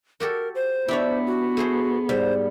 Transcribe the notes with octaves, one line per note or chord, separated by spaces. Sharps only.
F#4 G4 A4 A#4
C5
B3 D4 E4 G4 C#5
F#4
A3 G#4 C5
G#2 G3 C5